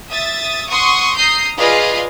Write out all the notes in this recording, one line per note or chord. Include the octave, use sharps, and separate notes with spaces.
E5 D#6 A6
F#5 C6 C#6 D#6
A#5 D#6 G6 C7
F4 G#4 B4 D5 D#5 F5